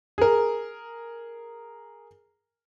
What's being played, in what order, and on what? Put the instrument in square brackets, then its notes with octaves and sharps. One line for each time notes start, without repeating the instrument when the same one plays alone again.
[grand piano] G#4 A#4